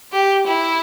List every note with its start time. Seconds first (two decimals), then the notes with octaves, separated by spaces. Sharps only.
0.13 G4
0.47 E4